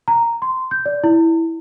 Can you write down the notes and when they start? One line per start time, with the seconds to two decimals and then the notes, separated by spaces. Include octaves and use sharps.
0.08 A#5
0.42 C6
0.71 G6
0.86 D5
1.04 E4